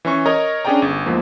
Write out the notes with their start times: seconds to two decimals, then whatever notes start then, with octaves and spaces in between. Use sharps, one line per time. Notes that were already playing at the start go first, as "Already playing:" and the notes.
0.05 E3 C#4 C#6
0.26 A#4 C#5 D#5 A#5
0.65 C#4 D4 G#4 D5 G5 A#5
0.82 G1
1.06 E2 G#2 F3 A#3